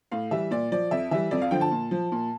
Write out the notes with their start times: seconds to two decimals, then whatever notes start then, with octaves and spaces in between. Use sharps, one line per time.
0.12 A2 F5
0.31 E3 G3 E5
0.51 A#2 D5
0.72 F3 D5
0.91 F2 E5
1.11 E3 G3 E5
1.31 F2 D5
1.42 F5
1.51 D3 F3 G5
1.61 A5
1.71 A#2
1.91 F3
2.12 A#2